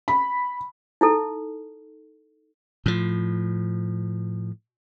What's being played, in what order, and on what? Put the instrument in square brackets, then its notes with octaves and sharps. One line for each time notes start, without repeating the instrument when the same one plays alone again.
[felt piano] B5
[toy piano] D#4 E4 A4
[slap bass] A2 F3